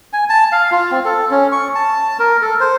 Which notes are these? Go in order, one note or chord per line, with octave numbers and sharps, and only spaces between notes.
G#5
A5
F5
F4
C4
A4
C#4
C#6
A5
A#4
A4
C5